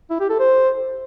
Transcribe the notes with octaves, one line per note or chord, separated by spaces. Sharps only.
E4
G4
A4
C5